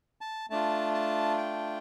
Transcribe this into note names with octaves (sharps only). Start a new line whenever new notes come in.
A5
A3 D4 F4 A5
A5
G5